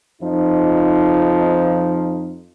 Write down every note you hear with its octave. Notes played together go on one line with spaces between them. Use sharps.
F2 F3 D#4